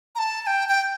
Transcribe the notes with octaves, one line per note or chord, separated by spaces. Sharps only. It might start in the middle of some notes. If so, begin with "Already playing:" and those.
A#5
A5
A5
G5
G5